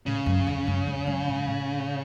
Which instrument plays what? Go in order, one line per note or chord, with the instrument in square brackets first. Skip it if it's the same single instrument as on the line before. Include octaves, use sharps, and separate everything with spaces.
[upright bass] A2 [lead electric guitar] C#3
[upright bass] F#2
E2
F#2
E2
F#2
G#2
A2